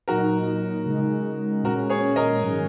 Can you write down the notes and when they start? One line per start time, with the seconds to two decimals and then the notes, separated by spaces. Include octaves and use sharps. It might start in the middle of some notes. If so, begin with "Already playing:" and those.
0.08 A#2 F#3 D#4 F#4 A#4
0.86 C#3 G#3 D#4
1.64 A#2 G#3 C#4 F#4 A#4
1.90 G#4 C#5
2.16 A#4 D#5
2.42 G#2 D#3 F#3 C#4 G#4